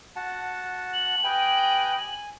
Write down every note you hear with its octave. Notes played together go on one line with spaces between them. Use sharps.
F#4 F#5 A5
F#7
G4 B4 D#5 G5 G#5
G#5